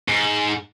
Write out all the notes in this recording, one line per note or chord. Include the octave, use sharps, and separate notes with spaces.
G#2